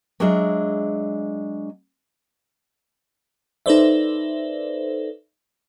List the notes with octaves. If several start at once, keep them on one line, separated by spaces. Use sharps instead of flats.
F#3 G#3 D4 F4 G#4 E5
D#4 A4 B4 C5 D5 E5